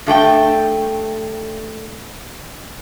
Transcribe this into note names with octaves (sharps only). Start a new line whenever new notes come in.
G2 A3 F#4 G5